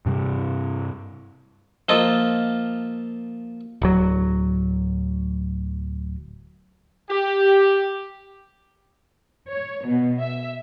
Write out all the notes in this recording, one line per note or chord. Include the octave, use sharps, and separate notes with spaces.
G2 C3 G3
F3 A#3 F4 A4 D#5
D1 F#3
G4
C#5
B2
E5